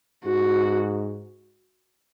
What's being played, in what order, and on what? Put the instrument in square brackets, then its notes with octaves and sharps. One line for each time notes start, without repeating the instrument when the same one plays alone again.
[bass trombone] G#2 [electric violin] F#4